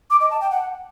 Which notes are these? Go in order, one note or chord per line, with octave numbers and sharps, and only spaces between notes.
D6
D#5
A5
G5
F#5